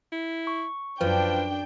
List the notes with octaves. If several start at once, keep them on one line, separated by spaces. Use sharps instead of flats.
E4
C#6
F#2 F3 D4 B4 G5